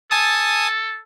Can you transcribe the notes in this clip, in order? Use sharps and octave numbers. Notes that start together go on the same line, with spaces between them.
A4 G#5 A5 D#6